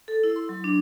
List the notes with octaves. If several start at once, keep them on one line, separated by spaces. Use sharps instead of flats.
A4
E4
C6
F#3
D4